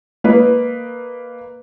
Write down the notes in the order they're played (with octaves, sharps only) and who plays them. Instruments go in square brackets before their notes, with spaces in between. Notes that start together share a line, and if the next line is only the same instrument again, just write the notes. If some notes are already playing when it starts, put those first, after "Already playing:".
[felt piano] A#3 B4 D#5